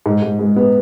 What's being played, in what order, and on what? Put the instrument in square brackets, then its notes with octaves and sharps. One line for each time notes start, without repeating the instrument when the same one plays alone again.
[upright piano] G#2
G#2
G#3
B3